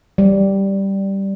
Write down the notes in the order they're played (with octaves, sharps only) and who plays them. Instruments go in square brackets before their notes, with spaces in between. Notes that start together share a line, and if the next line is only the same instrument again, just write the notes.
[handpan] G3